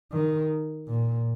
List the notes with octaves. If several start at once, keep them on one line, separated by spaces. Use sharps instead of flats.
D#3
A#2